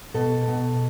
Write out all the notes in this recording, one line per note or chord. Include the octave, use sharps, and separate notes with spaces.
B2 A4
B2